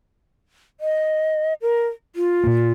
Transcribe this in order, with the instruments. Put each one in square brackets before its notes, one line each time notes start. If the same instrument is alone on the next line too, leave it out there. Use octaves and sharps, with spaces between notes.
[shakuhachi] D#5
A#4
F4
[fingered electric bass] A#2 A#3